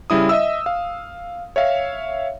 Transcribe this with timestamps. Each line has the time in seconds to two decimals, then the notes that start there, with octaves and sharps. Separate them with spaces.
0.10 C#3 G3 E4 D#6
0.29 D#5 E5 E6
0.66 F5
1.56 C#5 E5 F5